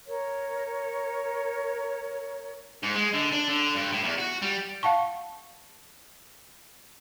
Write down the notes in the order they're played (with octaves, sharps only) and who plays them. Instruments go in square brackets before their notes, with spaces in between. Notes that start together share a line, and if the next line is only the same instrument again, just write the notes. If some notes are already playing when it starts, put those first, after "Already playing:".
[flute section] A#4 C#5
[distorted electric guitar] G#2
G#3
D3
D4
D3
G2
A2
E2
F#4
G3
[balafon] F5 F#5 A5 C#6